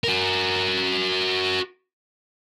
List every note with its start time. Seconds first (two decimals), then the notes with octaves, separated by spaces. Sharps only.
0.04 F#4 A#4